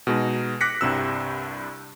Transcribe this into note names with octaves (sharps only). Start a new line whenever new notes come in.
B2 G#3 D#4
D6 F#6 A#6 B6 C#7
C2 G2 C3 E6